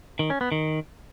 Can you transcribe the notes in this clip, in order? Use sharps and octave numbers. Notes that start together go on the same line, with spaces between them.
D#3
C#4
B3
D#3